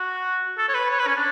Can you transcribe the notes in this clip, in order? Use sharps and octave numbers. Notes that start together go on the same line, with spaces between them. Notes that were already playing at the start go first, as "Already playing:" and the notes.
Already playing: F#4
A4
C#5
B4
C#5
B4
C#4
D4